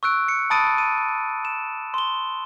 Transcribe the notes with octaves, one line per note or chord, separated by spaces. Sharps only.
C#6 E6 F#6 D7
C#7
A5 B5 D#6 A6 D7 D#7
D#7
E7
C6 G7